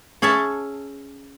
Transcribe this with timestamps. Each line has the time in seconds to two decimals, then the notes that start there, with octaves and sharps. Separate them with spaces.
0.22 C#4 G#4 C#5 E5 A5